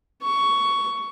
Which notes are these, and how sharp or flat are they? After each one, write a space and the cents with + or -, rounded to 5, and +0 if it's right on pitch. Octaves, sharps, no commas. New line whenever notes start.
C#6 +10